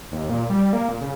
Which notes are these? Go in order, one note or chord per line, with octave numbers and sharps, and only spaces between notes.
D#2
A#2
G3
A#3
A#2
C#3